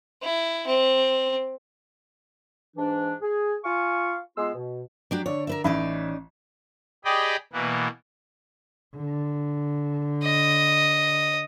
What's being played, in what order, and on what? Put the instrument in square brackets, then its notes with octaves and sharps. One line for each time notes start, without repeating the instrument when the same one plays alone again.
[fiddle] E4
C4
[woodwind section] G#2 E3 D4
G#4
F4 F5 G#5 C#6
G#3 B3 F4 C6 E6
B2
[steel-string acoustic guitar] F#3 D4 G4
[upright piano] D3 D5 [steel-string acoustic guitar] C#5
[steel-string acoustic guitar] A#4 B4 E5
[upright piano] A1 E5 B5 [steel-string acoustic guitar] C#4 D#4 D5
[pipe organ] G4 G#4 D5 D#5 G5 B5
B2 E3 A#3 B3
[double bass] D3
[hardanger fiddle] D#5